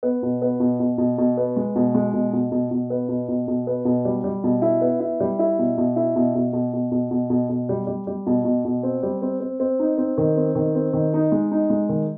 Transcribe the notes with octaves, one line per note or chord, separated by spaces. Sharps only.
B3
B2
B3
B2
B2
B2
B2
B3
G#3
B2
G#3
B2
B2
B2
B2
B3
B2
B2
B2
B3
B2
G3
G3
B2
E4
B3
E4
G3
E4
B2
B2
E4
B2
B2
B2
B2
B2
B2
B2
B2
G3
G3
G3
B2
B2
B2
C4
G3
C4
C4
C4
D#4
C4
D#3
C4
D#3
C4
D#3
D#4
G#3
D#4
G#3
D#3